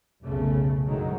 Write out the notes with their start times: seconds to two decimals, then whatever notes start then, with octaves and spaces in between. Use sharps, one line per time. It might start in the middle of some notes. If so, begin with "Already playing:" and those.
0.24 F1 B1 C#3 A3
0.86 F#2 D3 D#3 F#3 G#3